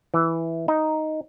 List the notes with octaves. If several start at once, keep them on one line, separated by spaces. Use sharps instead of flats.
E3
D#4